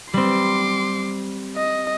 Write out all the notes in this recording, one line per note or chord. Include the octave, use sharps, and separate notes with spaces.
G3 C4 C6 D6
D#5